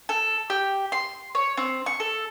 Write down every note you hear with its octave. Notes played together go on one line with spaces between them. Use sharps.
A4
G4
C6
C#5
C4
C#6
A4